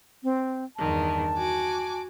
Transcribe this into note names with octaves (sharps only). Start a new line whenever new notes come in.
C4
E2 G2 D#3 A5
F#4 G#5 D6